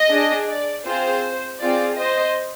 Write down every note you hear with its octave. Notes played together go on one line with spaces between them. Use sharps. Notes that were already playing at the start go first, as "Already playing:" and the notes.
Already playing: D#5
D4 G#4
D5
C4 F4 G#4 C5
C4 F4 G#4 D5
C5 D#5